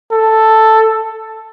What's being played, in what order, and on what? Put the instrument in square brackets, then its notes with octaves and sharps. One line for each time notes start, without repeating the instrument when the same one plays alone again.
[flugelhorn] A4